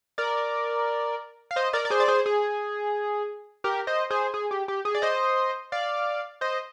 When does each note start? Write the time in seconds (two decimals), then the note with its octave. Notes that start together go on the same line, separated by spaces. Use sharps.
0.18 A#4 D5
1.51 F5
1.56 C5 D#5
1.73 A#4 D5
1.85 D5
1.90 G#4 C5
2.00 D5
2.08 G#4 C5
2.26 G#4
3.64 G4 A#4
3.87 C5 D#5
4.10 G#4 C5
4.34 G#4
4.51 G4
4.68 G4
4.85 G#4
4.95 D5
5.02 C5 D#5
5.72 D5 F5
6.41 C5 D#5